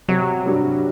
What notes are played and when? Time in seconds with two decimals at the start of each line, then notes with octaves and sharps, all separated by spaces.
0.08 C3 F#3
0.46 G3 D4 F#4